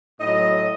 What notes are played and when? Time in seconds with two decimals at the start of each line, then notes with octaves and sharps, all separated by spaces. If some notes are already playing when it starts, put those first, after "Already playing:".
0.21 A2 F#3 D#5